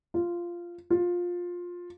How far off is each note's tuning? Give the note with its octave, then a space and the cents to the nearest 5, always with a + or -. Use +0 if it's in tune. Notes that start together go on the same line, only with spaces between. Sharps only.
F4 -10
F4 +15